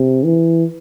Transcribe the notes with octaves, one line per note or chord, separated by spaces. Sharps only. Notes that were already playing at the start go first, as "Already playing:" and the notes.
Already playing: C3
E3